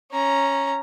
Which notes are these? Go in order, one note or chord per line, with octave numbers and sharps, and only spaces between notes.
C#4 A#5